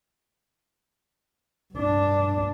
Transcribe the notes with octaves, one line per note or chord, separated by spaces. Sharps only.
G2 D4